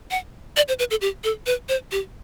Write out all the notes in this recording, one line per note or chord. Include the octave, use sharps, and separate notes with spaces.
F#5
D5
C5
B4
A4
G4
A4
B4
C5
G4